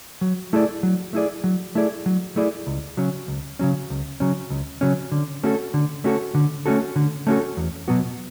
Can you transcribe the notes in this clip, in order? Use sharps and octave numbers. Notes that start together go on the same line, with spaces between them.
F#3
A3 E4 G#4 D5
F#3
A3 E4 G#4 D5
F#3
A3 E4 G#4 D5
F#3
A3 E4 G#4 D5
C#2
C#3 F#3 C#4
C#2
C#3 F#3 C#4
C#2
C#3 F#3 C#4
C#2
C#3 F#3 C#4
D3
A3 C#4 F#4 A4
D3
A3 C#4 F#4 A4
D3
A3 C#4 F#4 A4
D3
A3 C#4 F#4 A4
E2
B2 F#3 B3 F#4